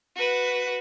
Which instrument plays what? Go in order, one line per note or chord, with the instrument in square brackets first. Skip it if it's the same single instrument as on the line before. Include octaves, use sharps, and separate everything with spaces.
[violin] F#4 B4